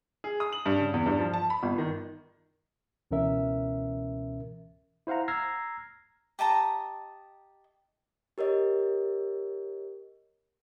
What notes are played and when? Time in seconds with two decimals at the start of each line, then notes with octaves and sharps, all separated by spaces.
0.24 G#4
0.40 D#6
0.52 F#7
0.66 G2
0.79 C#3
0.94 E2
1.06 G2
1.19 F3
1.34 A5
1.50 B5
1.63 G1
1.78 D#3
3.11 C#2 B2 E3 C#4 A#4 E5
5.07 E4 C5 F5 F#5 A#5
5.28 A#5 E6 F6 G#6 A#6 C7
6.39 G4 D#5 A5 A#5
8.38 G4 A#4 C#5 D#5